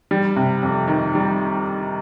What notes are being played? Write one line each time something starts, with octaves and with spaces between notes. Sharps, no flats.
G3
C3
F2
D#3
G3